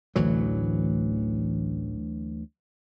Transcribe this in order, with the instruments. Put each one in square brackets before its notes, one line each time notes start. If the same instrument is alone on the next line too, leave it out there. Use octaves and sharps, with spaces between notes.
[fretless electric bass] A1 A2 [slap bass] D2 E3 F#3